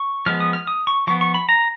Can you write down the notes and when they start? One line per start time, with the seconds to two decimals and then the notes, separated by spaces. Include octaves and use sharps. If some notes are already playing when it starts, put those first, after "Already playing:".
Already playing: C#6
0.26 F3 G#3 B3 F6
0.40 D#6
0.53 F6
0.67 D#6
0.87 C#6
1.07 F3 B3 C#6
1.21 C#6
1.34 B5
1.49 A#5